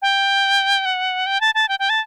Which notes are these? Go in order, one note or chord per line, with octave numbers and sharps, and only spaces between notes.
G5
F#5
G5
A5
A5
G5
G5
A5